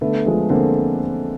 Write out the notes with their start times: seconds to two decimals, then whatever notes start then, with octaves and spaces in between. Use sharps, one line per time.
0.01 D3 A3 B3
0.26 F3 G#3
0.49 D3 A#3 C4